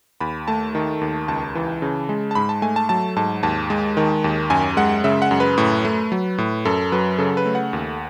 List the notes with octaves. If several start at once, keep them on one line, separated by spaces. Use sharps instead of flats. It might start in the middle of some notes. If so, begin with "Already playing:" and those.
D#2 B5
A3 A5
D#3
D#2
C#2 A5
E3
C#3
G#3
A5
G#2 B5
A5
A3 G#5
A5
F#3 A5
G#2 A5
D#2 A5
G#3
D#3
D#2
F#2 G#5
G#3 F#5
C#3 E5
F#5
F#2
B4
A2
A3
F#3
A2
F#2 A4
F#3 B4
C#3 A4
A4
B4
A3
F#5
D#2